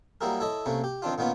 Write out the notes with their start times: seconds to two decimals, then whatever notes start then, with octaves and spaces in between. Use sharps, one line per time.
0.21 F#3 G3 A#3 E4 G#4 A#4
0.40 E4 A4 C#5 D#5
0.66 C3 A3 A#3 C#4
0.84 G4
1.02 D#3 C4 D4 F4
1.18 A#2 D#3 A#3 B3 C#4 F4